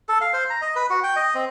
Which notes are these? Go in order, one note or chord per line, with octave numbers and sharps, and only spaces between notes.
A4
F5
C5
A#5
D#5
B4
F#4
G5
D#5
C4